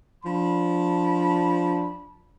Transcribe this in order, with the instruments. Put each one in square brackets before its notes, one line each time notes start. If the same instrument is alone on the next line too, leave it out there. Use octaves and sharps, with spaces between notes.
[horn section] F3 D4 B5